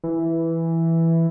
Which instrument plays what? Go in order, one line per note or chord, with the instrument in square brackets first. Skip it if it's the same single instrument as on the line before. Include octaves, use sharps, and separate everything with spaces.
[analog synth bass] E3